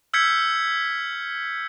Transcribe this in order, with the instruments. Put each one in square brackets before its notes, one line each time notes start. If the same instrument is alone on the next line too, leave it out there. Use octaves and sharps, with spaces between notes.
[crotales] E6 F6 G6 G#6 B6 C#7